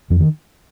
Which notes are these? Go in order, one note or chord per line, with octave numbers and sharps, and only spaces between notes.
F2 F3
D#3